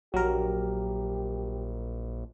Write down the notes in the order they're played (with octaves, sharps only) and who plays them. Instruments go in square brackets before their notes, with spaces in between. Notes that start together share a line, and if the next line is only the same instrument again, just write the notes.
[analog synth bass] A#1 [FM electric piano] F#3 A#4 [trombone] G4